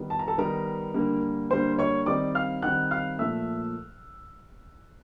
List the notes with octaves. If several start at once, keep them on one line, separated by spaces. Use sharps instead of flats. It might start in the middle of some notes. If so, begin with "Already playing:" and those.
Already playing: D#3 G3 B3 D#4
A5
A#5
A4 A5
D#3 G3 B3 D#4 A#4 A#5
D3 G3 A#3
D3 G3 A#3 C5 C6
C#5 C#6
D#3 G3 C4 D#4 D5 D6
F5 F6
D#3 G3 C4 D#4 F#5 F#6
F5 F6
A#2 F3 A3 E5 E6